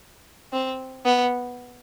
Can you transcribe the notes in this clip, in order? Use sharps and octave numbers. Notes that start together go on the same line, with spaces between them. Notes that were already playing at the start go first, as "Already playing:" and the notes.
C4
B3